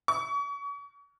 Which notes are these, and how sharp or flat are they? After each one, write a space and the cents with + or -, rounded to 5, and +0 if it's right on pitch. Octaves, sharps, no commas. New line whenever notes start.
C#6 +35